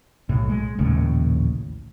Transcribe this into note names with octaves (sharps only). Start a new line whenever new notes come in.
B1 A2
G#3
A#1 D#2 A2 C#3